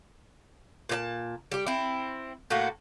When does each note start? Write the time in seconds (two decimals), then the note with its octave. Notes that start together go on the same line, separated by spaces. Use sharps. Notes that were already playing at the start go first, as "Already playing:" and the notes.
0.89 A#2 G4 A5
1.51 G3 G4
1.67 C4 E4
2.50 A2 A3 A#3 F#4